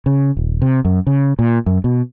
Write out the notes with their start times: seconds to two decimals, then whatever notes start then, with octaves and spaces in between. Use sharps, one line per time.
0.06 C#3
0.37 D#1
0.62 C3
0.85 F#2
1.07 C#3
1.39 A#2
1.66 F#2
1.84 B2